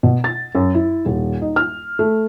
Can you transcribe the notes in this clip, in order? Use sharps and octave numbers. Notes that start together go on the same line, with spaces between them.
B2
A6
F#2
E4
D#1
D#4
F6
A3